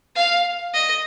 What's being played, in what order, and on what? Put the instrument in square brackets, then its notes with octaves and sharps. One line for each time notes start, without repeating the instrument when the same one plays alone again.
[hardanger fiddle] F5
D#5